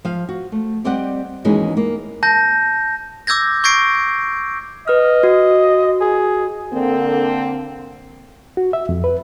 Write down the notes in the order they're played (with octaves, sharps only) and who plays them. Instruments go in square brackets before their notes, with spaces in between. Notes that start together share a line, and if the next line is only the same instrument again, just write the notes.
[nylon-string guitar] F3 F5
F#4
A3
G3 C4 G4 D5 D#5 F#5
D#2 E3 G#3 C#4 D#4 F#4
A#3
[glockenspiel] A5 G6 A#6
D6 E6 G6 G#6 A#6
C#6 G6 G#6 A#6 C7 D7
[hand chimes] B4 F6 [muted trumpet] D#5
[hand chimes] F#4
[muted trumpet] G#4
[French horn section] D3 A#3 C4
[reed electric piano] F#4
E5
F2
B4